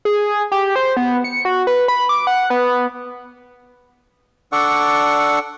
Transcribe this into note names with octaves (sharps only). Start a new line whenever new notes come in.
G#4
G4
C5
B3
C#7
F#4
B4
B5
D6
F#5
B3
D4 A4 D5 F#5 C#6